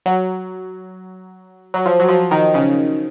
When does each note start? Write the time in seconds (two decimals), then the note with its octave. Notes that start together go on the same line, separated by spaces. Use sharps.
0.06 F#3
1.74 F#3
1.86 F3
1.99 F#3
2.09 F3
2.31 D#3
2.54 C#3